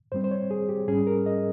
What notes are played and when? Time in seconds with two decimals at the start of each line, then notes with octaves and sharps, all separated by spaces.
0.12 G2 G3 C4 C5
0.24 C5
0.31 C#5
0.51 G#4
0.69 G4
0.88 G#2 G3 C#4 G#4
1.07 A#4
1.26 D#5